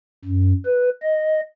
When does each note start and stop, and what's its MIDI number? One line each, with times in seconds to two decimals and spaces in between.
0.25 0.53 42
0.65 0.89 71
1.02 1.40 75